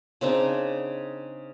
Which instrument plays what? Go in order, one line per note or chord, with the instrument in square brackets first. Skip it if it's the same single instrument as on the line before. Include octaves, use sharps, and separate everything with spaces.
[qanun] C#3 C4 D4 D#4